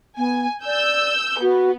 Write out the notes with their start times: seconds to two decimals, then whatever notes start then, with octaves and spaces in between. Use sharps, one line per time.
0.17 B3 G#5
0.66 D5 E6 G6
1.42 B3 F#4